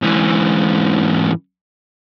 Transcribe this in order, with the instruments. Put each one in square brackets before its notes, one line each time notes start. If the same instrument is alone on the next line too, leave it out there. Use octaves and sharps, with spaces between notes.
[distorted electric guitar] G#2 E3